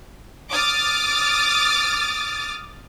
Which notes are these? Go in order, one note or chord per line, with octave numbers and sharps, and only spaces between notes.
D6 D#6 F6 A6